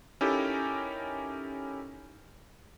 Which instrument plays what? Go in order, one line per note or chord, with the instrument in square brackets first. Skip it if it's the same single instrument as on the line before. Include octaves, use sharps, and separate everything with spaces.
[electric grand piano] C#4 D#4 E4 G4 A4 A#4